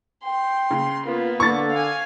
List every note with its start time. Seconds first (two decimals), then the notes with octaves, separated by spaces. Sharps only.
0.24 G5 C6
0.71 C#3
1.06 A#3 B3 F4
1.40 D3 C#6 A6
1.71 F5 G#5